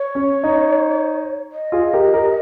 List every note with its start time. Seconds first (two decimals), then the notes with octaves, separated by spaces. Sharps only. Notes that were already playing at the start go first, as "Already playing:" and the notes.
Already playing: C#5
0.15 C#4
0.44 D#4
1.52 D#5
1.72 F4 G#4
1.94 G4 A#4
2.14 G4 A#4